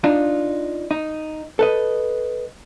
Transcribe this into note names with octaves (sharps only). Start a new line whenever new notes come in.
D4 D#4 F4
D#4
A4 B4 D#5